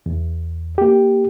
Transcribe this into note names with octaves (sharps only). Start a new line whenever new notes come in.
E2
A#3 G4